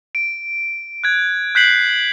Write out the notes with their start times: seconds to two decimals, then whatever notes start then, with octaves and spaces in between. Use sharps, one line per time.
0.15 D7
1.04 F#6 G#6
1.55 F#6 G6 B6 C7 F#7